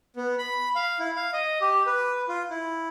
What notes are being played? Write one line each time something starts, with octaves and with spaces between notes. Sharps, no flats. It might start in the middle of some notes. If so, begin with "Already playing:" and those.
B3
B5
F5
E4
F5
D#5
G4
B4
F4
E4